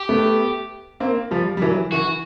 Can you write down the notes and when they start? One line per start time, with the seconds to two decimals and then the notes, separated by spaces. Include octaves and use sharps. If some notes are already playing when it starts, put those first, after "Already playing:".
Already playing: G4
0.09 A3 B3
1.00 A#3 C4
1.31 F3 G3
1.57 G3
1.62 E3 F#3
1.92 E3 F#4